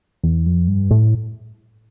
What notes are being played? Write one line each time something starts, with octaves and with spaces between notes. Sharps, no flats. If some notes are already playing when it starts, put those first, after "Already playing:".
E2
F2
G2
A2